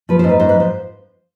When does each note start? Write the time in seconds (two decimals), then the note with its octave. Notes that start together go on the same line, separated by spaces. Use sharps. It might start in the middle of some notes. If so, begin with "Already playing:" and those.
0.09 F3 B4
0.19 C5
0.24 G#2
0.29 B4
0.40 G#2 C5
0.49 B4
0.54 F3
0.60 C5